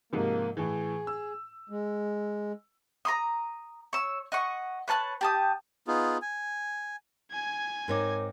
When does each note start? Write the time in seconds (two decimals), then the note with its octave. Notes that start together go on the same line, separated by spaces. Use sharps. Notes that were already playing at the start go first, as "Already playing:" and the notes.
0.13 G#2 C3 F3 A#3
0.57 A2 E3 G#4
1.07 E6
1.70 G#3
3.05 A#5 C6 D#6
3.93 C#5 E6
4.32 D#5 F#5 C#6
4.88 B4 C#5 A5 F#6
5.21 G4 A5 D#6
5.87 B3 D#4 F4 G#4
6.22 G#5
7.31 G#5 G#6
7.88 G#2 C4 D#4 A#4 C#5 D6